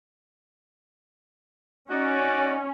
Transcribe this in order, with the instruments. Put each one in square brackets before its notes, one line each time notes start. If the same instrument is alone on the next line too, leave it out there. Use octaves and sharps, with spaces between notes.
[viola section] C#4 [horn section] D#4 F#4 D5